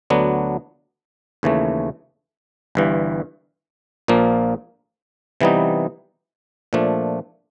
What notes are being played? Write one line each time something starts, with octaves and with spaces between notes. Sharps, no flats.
D2 D3 F#3 B3 D4
D#2 C#3 E3 A3
G1 G2 E3
A#1 A#2 F3 A#3
C3 E3 G3 B3 D#4
A#2 F3 A3 D4